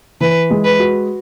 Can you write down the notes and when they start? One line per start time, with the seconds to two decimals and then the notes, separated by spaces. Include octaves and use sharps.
0.21 E3 B4
0.51 G#3
0.65 B4
0.80 F#4